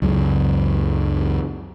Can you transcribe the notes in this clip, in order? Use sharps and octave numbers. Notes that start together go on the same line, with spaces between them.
C#2 F#2